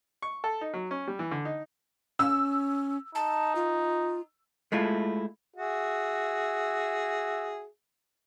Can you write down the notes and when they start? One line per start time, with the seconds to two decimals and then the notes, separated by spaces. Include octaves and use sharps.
0.22 C#6
0.44 A4
0.61 D#4
0.74 F#3
0.91 C#4
1.08 G3
1.19 E3
1.31 D3
1.45 D#4
2.19 C#4 E6
3.15 D#4 A5
3.55 F4
4.72 G#3 A3 E4 F4
5.56 F#4 G#4 E5